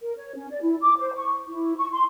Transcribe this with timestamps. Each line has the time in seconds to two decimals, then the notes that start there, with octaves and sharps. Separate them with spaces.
0.01 A#4
0.16 C#5
0.35 C#4
0.50 D5
0.62 E4
0.82 D6
0.98 C5
1.15 C#6
1.49 E4
1.77 C#6
1.91 C6